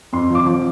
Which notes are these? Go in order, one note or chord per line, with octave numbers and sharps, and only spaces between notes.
F2 C6
F3 D6
F3